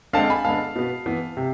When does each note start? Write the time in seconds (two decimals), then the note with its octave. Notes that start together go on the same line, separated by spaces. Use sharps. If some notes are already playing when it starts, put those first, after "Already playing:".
0.13 D3 G#3 C4 F5 A5
0.30 G#5 B5
0.44 D3 G#3 B3 F5 A5
0.75 B2 B3
1.06 E3 B3
1.37 C3